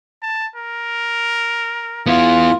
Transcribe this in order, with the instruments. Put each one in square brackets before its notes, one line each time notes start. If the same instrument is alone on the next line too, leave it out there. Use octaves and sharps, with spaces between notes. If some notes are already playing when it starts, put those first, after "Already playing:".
[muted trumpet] A5
A#4
[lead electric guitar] B3 E4 [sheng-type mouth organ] F4